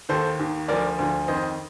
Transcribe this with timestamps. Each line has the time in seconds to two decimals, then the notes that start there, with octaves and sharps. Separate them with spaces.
0.09 D#2 D#3 A4 C5
0.39 D#2 D#3
0.68 D2 D3 F3 A#4 D5
0.99 D2 D3 F3
1.28 F2 D#3 C5 D#5